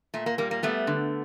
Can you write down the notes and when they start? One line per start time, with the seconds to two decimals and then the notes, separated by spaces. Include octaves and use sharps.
0.14 A#2 A3
0.26 A#3
0.38 G3 A#3
0.51 A#3
0.63 G3 A3 B3
0.87 D3